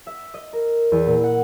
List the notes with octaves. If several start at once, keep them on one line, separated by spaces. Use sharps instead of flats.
E5
D#5
A#4
E2
A#2
F#5